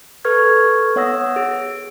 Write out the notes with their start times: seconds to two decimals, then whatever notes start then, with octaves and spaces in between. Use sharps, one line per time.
0.25 A4 B4 C#6 F6 G#6
0.96 B3 C#5 F#5 D#6 E6 A#6
1.36 G#4